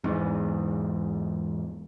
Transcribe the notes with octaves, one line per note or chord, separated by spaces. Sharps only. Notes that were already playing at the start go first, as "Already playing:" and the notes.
E2 G#2